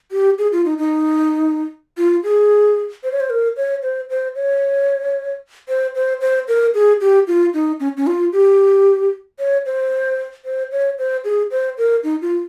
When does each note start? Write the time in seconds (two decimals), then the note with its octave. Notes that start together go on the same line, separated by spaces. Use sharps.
0.12 G4
0.38 G#4
0.52 F4
0.65 D#4
0.78 D#4
1.98 F4
2.24 G#4
3.03 C5
3.12 C#5
3.20 C5
3.30 A#4
3.57 C#5
3.82 C5
4.10 C5
4.35 C#5
5.68 C5
5.95 C5
6.21 C5
6.48 A#4
6.74 G#4
7.01 G4
7.27 F4
7.54 D#4
7.80 C#4
7.97 C#4
8.07 F4
8.33 G4
9.39 C#5
9.66 C5
10.45 C5
10.72 C#5
10.98 C5
11.24 G#4
11.51 C5
11.78 A#4
12.04 D#4
12.22 F4